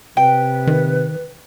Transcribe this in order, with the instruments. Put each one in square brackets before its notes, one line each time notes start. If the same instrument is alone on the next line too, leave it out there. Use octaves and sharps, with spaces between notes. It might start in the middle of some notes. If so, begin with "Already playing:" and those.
[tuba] C3 [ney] B4 [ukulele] G5
[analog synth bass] D#3